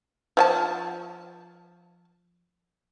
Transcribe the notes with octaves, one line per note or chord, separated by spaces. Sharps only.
F3 G#5 A5